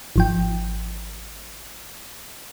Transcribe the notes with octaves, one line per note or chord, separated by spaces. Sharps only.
G#1 F3 G5